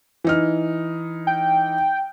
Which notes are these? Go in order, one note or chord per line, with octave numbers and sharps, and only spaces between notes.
E3 D#4 F6
G5